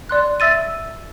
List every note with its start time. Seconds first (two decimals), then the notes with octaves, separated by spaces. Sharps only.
0.09 D5 C6 F#6
0.40 E5 E6 A6 D#7